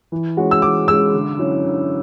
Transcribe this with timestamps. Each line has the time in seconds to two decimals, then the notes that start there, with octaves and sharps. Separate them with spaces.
0.12 E3
0.37 G#3 C#4 F#4
0.51 E6
0.62 E3 D6
0.88 G#3 C#4 F#4 E6
1.14 D3
1.38 F#3 C#4 E4
1.65 D3